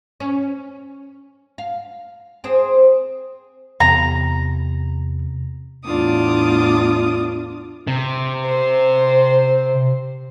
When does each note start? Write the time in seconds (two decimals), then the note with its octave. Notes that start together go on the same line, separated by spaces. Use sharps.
0.20 C#4
1.58 F5
2.44 C4 G#4 C5
3.80 E2 C3 A#5
5.84 E2 A2 D4 F4 D6 D#6
7.87 C3
8.46 C5